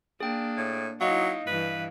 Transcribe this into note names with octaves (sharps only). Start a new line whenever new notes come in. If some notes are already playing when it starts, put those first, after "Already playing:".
A#3 D4 G#4 G5
A2
F#3 D#4 E4 D#5 F5
G2 E3 B4